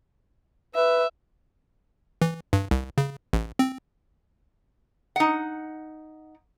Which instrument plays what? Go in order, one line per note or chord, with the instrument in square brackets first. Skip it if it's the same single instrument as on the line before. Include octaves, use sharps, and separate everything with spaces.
[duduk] B4 [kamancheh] E5
[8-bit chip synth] E3
G2
C2
C#3
A1
C4
[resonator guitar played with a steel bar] D#4 F#5